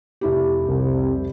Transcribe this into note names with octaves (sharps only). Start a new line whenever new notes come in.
F1 E4 G4
C2